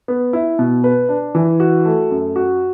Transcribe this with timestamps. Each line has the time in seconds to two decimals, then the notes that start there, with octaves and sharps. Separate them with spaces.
0.08 B3
0.33 E4
0.59 B2
0.84 B4
1.09 D4
1.35 E3
1.60 F#4
1.85 A3
2.11 F#2
2.36 F#4